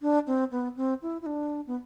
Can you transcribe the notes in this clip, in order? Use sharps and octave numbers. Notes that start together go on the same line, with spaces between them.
D4
C4
B3
C4
E4
E4
D4
B3